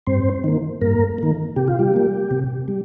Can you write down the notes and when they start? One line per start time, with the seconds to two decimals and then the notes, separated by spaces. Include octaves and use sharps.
0.07 G2 C4 C5
0.44 D#3 A#3
0.81 G2 A#3 A#4
1.18 D#3 A#3
1.56 C3 G4
1.68 F4
1.79 G3 G4
1.94 G3 A#3
2.31 C3
2.68 G3